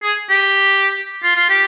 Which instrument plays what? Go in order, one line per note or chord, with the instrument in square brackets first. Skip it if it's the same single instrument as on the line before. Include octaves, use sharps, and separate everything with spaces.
[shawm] G#4
G4
F4
F4
G4